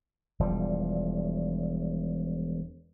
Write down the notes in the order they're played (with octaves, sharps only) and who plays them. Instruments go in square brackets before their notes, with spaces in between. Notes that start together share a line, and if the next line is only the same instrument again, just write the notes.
[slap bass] E1 F3 G3